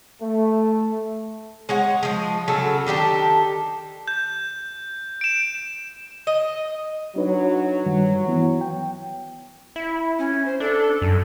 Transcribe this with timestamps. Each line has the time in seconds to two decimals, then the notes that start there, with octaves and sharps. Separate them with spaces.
0.22 A3
1.69 G#3 C#5 F#5
2.03 F3 G#3
2.48 C#3 F#3 F#4 A4
2.87 D#3 D4 G4 A4
4.08 G6
5.21 D7 E7
6.27 D#5
7.16 F#3 D4 D#4 B4
7.86 G2 D#3 G3
8.28 E3 B3 E4
8.61 G5
9.76 E4
10.19 C#4
10.46 C5
10.60 D4 A4
11.02 F#2